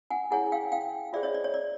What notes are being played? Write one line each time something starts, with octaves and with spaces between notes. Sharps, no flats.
F#5 G#5
E4 G#4 C#5 F#5 G#5
F5 G5
F5 G5
F4 G#4 C5 D5 E5
C#5 D#5
D5
C#5
D5